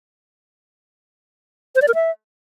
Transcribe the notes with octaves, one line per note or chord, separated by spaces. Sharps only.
C5
D5
A#4
E5